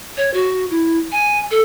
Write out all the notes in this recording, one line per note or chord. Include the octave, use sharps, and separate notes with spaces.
C#5
F#4
E4
G#5
A4